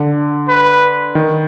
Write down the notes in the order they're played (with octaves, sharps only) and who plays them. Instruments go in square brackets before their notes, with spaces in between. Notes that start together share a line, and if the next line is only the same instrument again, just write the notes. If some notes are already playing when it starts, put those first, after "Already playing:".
Already playing: [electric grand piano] D3
[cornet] B4
[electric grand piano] D#3